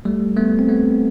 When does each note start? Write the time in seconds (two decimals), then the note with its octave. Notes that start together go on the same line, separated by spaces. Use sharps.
0.05 G3 A3
0.36 A3 B3
0.59 C4
0.69 A3 B3